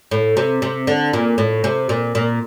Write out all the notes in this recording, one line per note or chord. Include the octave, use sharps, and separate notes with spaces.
A2
C3
C3
D3
A#2
A2
C3
A#2
A#2